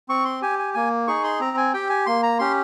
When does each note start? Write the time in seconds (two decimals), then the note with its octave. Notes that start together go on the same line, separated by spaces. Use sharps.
0.09 C4 C#6
0.25 C6
0.42 G4 G#5
0.59 G#5
0.74 A#3 G#5
1.08 D#4 G#4 C#6
1.24 C6
1.40 C4 A#5
1.57 G#5
1.73 G4 G5
1.90 G#5
2.06 A#3 C6
2.23 A#5
2.39 C#4 G4 C6